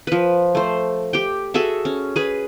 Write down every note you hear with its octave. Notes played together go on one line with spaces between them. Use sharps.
F3 B4
A3 C5
G4 G5
F#4 G#4 A4 E5
C#4
G#4 B4